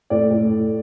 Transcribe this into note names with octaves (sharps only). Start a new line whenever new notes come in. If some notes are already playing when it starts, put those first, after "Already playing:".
A2 D5
A2